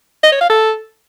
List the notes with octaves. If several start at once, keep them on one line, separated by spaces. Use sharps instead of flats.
D#5
C#5
F5
A4